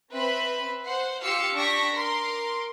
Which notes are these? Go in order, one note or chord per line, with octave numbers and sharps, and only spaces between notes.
C4 B4 E5 B5
C5 F#5
F4 G4 F5 E6 C#7
D4 G4 C#6 A#6 B6 D7
A#4 C6 D6